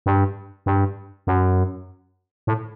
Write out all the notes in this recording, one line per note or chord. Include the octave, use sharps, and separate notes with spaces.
G2
G2
F#2
A2